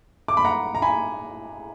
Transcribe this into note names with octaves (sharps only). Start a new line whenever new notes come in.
D6
B5
F#5 A#5
A#5
G#5 B5